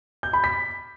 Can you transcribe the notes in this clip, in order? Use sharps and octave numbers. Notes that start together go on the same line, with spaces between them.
G6
B5
B6